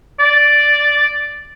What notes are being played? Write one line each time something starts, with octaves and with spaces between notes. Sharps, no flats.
D5